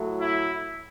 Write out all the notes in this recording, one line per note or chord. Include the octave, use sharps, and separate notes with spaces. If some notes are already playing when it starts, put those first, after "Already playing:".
Already playing: A2 F#3 A3
E4